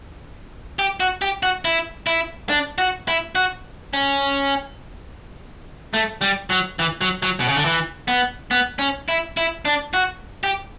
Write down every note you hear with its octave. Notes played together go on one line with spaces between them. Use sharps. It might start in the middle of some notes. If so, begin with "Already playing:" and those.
G4
F#4
G4
F#4
E4
E4
D4
F#4
E4
F#4
C#4
A3
G3
F#3
E3
F#3
F#3
B2
C#3
D3
E3
B3
B3
C#4
E4
E4
D4
F#4
G4